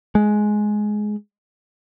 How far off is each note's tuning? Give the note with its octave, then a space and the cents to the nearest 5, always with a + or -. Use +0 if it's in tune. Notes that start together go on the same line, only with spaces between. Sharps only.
G#3 +15